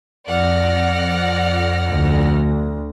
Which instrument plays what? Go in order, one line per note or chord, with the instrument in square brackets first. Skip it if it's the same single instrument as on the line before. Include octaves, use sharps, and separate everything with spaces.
[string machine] F2 A#6 [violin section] D5 F#5 F6
[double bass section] D2